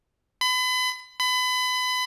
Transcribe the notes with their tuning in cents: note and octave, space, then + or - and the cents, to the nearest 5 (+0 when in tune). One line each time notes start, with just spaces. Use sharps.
B5 +35
B5 +30